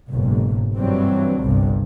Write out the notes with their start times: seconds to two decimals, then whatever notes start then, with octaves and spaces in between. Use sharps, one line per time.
0.10 F#1 B1 G#2
0.75 G2 E3 F#3 G3 C4
1.40 G1 C2 G2